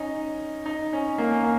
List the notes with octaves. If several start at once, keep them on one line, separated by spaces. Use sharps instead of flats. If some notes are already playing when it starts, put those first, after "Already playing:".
Already playing: C#4 D#4
D#4
C#4
A#3
C#4
A#3